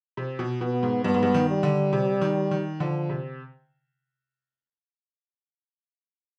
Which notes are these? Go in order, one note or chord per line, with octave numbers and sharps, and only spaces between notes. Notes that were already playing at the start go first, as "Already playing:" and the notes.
C3
B2
B2 B3
G#2
G2 B3
G#2
G2
D#3
G3
D3
C3
D#3
D#3
D3 F3
C3